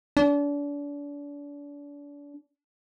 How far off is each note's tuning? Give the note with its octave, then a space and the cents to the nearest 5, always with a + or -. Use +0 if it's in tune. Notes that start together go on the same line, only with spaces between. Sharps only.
D4 -35